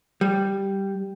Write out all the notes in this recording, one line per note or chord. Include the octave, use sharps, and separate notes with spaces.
G3